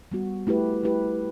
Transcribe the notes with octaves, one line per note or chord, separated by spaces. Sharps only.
G3 B3 F#4
A3 E4 G4 B4
A3 E4 G4 B4